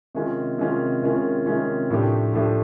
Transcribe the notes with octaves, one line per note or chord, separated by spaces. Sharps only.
C3 D#3 G#3 C#4 F4
C3 D#3 G#3 C#4 F4
C3 D#3 G#3 C#4 F4
C3 D#3 G#3 C#4 F4
A2 F3 A3 D4 G4
A2 F3 A3 D4 G4